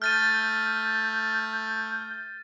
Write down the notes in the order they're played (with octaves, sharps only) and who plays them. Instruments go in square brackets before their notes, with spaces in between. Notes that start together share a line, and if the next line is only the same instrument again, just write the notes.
[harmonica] A3 [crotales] F6 A6 D#7 [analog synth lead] G6